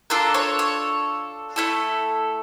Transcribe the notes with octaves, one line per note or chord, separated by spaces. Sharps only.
D4 F4 A4 A#4
C#5
C#5
A3 E4 A4